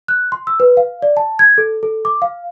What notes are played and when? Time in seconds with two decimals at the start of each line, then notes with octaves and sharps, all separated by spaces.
0.08 F#6
0.32 C6
0.47 E6
0.60 B4
0.77 F5
1.02 D5
1.17 A5
1.39 G#6
1.58 A4
1.83 A4
2.05 D6
2.22 F5